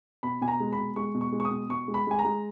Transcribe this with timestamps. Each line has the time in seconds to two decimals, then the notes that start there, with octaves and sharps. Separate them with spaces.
0.23 B2 B5
0.41 B2 G#5
0.48 A#5
0.60 G#3
0.73 B5
0.78 B2
0.96 G#3 C#6
1.15 B2
1.21 C#6
1.32 G#3
1.40 C#6
1.45 D#6
1.51 B2
1.69 B2 C#6
1.88 G#3
1.94 B5
2.07 G#3 G#5
2.19 A#5
2.24 G#3